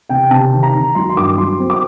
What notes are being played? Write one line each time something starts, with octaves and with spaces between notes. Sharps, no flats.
C3 G5
C3 A5
D#3
A#5
D#3
F#3 C6
C6
G2 D6
F#3 C6
C4
D6